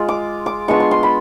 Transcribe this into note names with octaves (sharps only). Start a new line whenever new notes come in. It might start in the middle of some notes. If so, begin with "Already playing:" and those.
Already playing: G#3 F4
D6
D6
G#3 B3 D4 F4 C#6
C6
C6
B5